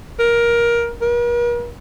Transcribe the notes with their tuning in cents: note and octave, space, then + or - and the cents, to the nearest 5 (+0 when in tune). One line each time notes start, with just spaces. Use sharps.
A#4 +15
A#4 +45